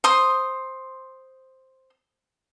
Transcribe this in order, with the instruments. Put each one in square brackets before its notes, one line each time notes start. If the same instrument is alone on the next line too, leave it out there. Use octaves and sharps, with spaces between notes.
[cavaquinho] C5 C6 D#6